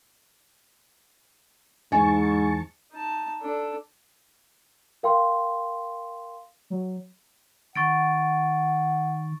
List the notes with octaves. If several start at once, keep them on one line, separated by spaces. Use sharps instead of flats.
E2 G#2 G#5 A5 C#6
D#4 A5
D4 A4
A#4 F5 G5 C6
F#3
D#3 F#5 C#6 A6 D7